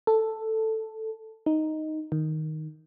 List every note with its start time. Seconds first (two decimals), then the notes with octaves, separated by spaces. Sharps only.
0.07 A4
1.46 D#4
2.12 D#3